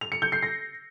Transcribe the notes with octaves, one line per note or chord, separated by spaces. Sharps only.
F7
C#7
G6
C7
A#6